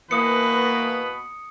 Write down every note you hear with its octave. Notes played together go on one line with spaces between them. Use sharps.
B2 E3 A#3 B3 B4 D#6 C#7